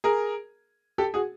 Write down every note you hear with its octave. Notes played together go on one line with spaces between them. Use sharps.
G#4 A#4
G4 A4
F#4 G#4